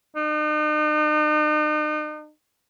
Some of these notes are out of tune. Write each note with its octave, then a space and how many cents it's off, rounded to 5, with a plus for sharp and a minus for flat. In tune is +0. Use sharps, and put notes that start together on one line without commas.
D#4 -40